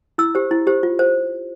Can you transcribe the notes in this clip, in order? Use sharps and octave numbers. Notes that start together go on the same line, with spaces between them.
E4 E6
G4 C5
E4
G4 C5
F4
C5